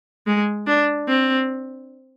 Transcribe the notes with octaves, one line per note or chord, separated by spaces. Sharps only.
G#3
D4
C4